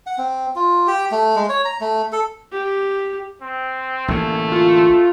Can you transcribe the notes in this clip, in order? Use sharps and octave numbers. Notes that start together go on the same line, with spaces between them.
F#5
C4
F4
G4
A3
G#3
C#5
A#5
A3
A4
G4
C4
A1 D2 A3 A#3
F4